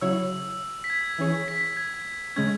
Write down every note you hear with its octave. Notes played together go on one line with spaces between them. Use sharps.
C#3 F#3 E4 C#5 E6
B6
G#6
G#6
E3 C#4 G#4 C#5
B6
G#6
C#3 G#3 C#4 G#6